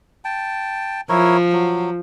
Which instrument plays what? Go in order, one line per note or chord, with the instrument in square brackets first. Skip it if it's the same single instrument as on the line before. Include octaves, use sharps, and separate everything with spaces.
[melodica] G5 A5
[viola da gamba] F3 [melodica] E4 A#4 C#5
[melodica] F#3